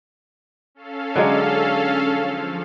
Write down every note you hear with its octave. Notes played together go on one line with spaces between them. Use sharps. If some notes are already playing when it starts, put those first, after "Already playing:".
C#4 A4 F5
D3 F#3 G#3
F3